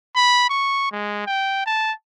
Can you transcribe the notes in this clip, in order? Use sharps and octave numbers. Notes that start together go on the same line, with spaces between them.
B5
C#6
G#3
G5
A5